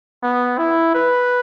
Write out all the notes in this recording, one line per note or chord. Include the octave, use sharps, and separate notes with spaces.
B3
E4
B4